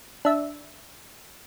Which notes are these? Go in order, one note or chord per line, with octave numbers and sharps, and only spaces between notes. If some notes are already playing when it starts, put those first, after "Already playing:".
D4 E5